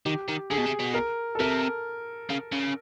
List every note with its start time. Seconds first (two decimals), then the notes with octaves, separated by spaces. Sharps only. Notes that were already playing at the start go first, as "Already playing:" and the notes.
0.05 D#3 G4
0.28 D#3
0.50 D3 G#4
0.57 B2
0.66 C3
0.79 B2
0.94 A#4
1.35 A4
1.40 C3 A#4
2.29 C#3
2.52 C#3